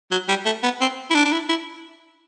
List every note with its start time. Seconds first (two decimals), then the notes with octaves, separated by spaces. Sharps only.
0.11 F#3
0.28 G3
0.45 A3
0.63 B3
0.81 C4
1.10 E4
1.15 D4
1.25 D4
1.32 E4
1.49 E4